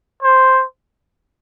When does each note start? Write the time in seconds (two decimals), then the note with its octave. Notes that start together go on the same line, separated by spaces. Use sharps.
0.23 C5